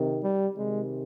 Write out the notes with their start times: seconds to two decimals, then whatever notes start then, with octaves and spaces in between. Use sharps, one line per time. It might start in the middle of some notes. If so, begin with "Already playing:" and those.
Already playing: C3 D#3
0.22 G3
0.56 C3 D#3 G#3